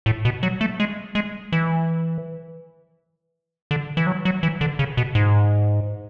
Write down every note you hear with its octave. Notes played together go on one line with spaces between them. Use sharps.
A2
B2
F#3
A3
G#3
G#3
E3
D3
E3
F#3
F#3
E3
D3
C#3
B2
G#2